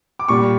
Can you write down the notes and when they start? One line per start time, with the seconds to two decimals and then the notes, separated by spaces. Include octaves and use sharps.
0.19 D6
0.28 A#2 G3 C#6